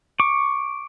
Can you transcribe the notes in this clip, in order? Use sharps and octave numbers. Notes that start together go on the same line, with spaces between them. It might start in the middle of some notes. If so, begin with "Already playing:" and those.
C#6 D6